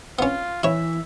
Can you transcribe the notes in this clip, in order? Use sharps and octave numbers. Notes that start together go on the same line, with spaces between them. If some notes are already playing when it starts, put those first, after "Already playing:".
B3 C#4 F4
E3 E4 C#5 E5